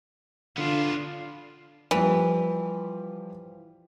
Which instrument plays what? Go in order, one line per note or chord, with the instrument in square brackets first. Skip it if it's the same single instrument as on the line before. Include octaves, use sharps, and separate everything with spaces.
[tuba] D3 [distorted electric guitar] B3 D4 [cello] F4
[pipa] E3 [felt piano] F3 G3